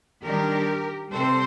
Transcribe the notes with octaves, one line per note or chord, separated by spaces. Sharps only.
D#3 G3 D4 G4 A#4
C3 G3 C4 A4 C5